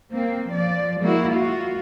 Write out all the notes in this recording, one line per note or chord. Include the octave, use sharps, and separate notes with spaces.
A#3 C4
F3 D5
G#3 A#3 E4 F#4
F4 F#4